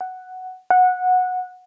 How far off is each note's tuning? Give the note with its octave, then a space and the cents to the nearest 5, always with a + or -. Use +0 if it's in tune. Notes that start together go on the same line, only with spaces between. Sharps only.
F#5 +5
F#5 -15